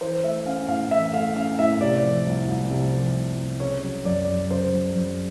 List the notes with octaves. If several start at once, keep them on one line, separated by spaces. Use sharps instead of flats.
E3 C5
A3 E5
C#4 F5
A2 F5
E3 E5
A3 F5
C#4 F5
A2 E5
C3 D5
F3
C2
C2
C3
F3
C2
C2
C#3 C#5
F#3
F#2 D5
F#2
C#3 C5
F#3
F#2